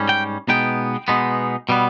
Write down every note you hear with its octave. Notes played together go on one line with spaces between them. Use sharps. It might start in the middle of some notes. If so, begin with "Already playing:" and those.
Already playing: G#2 G3 C#4
G5
B2 G#3 B3 D#4 G5
B2 G#3 B3 D#4
B2 G3 B3